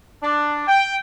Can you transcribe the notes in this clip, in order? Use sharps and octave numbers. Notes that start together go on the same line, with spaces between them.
D4
G5